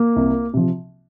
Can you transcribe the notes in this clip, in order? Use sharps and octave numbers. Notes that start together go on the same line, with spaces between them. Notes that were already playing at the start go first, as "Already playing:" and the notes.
Already playing: A#3
C2
C3 F3